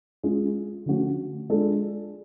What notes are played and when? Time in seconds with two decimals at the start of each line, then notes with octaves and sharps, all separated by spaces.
0.23 G#3 C#4 F4 G#4
0.86 D3 F3 A3 C#4 F#4
1.50 G#3 D4 F4 A4